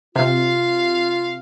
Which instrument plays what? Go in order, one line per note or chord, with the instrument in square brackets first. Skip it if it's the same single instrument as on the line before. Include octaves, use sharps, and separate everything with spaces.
[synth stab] C3 [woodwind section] F4 [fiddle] F5